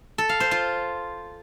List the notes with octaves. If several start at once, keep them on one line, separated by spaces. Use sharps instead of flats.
A4
F5
C5
F4